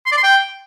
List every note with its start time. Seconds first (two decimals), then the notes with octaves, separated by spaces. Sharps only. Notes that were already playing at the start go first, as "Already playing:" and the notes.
0.06 C6
0.12 D5
0.17 C6
0.23 G5